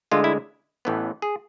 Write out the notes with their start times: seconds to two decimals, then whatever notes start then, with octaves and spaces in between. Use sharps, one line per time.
0.12 D2 D3 G#3 F4
0.24 E4
0.85 A1 A2 E3 B3
1.22 G#4